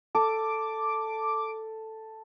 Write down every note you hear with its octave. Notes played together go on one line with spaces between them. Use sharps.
A4 D6